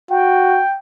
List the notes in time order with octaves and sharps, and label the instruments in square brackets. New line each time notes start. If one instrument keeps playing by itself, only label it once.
[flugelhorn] F#4 [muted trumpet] G5